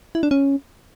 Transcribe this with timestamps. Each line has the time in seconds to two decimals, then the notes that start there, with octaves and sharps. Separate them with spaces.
0.15 E4
0.23 D4
0.31 C#4